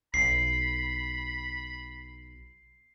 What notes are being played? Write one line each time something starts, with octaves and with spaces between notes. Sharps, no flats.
B1 B5 C7